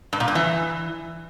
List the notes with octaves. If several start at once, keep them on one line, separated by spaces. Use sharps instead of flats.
G2
A#2
G2
E3